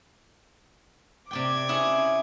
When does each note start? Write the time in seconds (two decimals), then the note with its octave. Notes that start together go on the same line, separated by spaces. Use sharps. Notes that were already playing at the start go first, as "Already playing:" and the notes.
1.31 C3 D5 G5 D6 G#6
1.69 C#4 E4 G#4